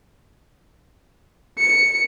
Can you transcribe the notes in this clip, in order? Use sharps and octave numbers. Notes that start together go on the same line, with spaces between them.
C#7